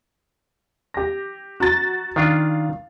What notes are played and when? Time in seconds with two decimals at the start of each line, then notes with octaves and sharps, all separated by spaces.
0.94 G4 A#6
1.60 F#4 A#5 A6
2.16 D#3 D4 F4 F5